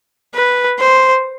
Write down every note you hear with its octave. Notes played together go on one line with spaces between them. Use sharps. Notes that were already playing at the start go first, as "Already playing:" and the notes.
B4
C5